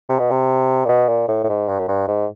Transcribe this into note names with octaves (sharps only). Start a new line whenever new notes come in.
C3
B2
C3
A#2
B2
A#2
A2
A2
G#2
G2
F#2
G2
G#2